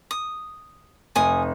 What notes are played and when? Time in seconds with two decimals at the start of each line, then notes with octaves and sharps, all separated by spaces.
0.11 D#6
1.16 F1 G#5 D#6